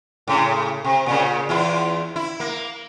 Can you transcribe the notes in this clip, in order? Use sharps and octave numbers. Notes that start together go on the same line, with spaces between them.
A2 C#3
C3
A#2 C#3
E2 E4 F4
E4
A#3